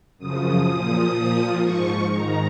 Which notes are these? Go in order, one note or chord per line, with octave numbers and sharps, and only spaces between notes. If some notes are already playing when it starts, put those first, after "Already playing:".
F#2 C#3 F3 D#6
A#2 F3
A#2 F3
G#2 F3 C#6
G#2 D#3 A#5